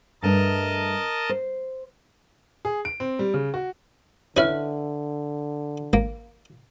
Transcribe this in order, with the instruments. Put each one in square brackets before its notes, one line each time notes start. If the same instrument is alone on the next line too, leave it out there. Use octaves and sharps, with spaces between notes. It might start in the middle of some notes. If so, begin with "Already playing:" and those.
[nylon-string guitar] G2 A3 D4 [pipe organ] A#4 D#5 A5
[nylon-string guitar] C5
[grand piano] G#4
D7
C4
G3
C#3
F#4
[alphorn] D3 [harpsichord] C#4 E4 [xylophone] B4 E5 F6
[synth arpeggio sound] G#1 [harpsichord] A#3